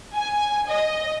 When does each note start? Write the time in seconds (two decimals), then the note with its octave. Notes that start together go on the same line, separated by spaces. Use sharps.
0.15 G#5
0.69 D#5